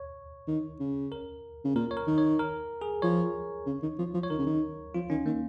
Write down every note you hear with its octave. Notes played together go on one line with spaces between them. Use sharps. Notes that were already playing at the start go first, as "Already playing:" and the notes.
Already playing: C#5
D#3
C#3
A#4
C#3
A#2 A#4
C#5
A#4
D#3
C#5
A#4
G#4
F3 C#5
C#3
D#3
F3
F3
C#5
D#3 A#4
C#3
D#3
F3 F4
D#3 C#4
D#3 A#3